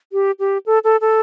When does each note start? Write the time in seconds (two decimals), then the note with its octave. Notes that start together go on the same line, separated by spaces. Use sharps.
0.13 G4
0.39 G4
0.66 A4
0.84 A4
1.01 A4